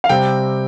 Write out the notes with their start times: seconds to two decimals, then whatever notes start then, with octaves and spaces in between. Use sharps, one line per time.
0.04 F5
0.09 C3 G3 C4 G5